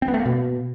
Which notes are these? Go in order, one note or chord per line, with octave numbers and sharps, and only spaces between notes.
C4
B3
A3
A#3
B2